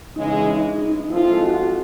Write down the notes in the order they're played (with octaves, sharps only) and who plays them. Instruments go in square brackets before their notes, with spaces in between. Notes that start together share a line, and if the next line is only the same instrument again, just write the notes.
[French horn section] C#3 E3 G#3 [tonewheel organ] D#4
[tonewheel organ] D#4
D#4
[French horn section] F3 G#3 C4 F4 A4 [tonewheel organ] E4
[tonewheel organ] F#4